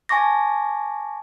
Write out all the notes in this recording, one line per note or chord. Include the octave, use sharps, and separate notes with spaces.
G#5 A5 C#6 D6 A#6